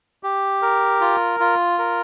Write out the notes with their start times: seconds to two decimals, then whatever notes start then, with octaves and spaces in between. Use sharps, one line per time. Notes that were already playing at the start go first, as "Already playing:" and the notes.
0.23 G4
0.62 A#4
1.01 F4
1.40 F4
1.79 A#4